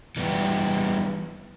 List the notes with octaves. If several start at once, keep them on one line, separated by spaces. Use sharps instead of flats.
E3 G3 B3 E4 G4